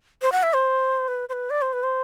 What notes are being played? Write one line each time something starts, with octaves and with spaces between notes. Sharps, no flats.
C5
F#5
E5
C5
B4
C5
B4
D5
C5
B4
C5